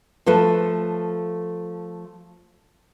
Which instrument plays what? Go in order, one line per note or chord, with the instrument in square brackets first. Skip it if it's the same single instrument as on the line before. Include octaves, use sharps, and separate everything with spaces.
[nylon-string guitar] F3 A3 A4 B4